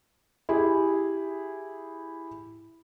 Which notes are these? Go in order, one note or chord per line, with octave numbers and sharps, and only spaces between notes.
E4 G4 G#4